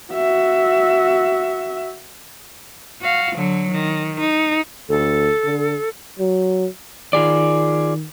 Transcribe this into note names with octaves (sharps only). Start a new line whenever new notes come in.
F#4 E5
F#4 F5
D3 F#3
D#3
D#4
D2 A4
D3
F#3
D#3 F4 G#4 D5